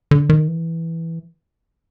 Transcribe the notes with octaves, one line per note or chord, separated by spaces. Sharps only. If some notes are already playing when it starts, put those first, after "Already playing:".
D3
D#3
E3